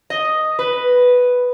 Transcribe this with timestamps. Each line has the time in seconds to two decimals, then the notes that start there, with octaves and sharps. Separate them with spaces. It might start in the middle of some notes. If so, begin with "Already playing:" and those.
0.10 D#5
0.59 B4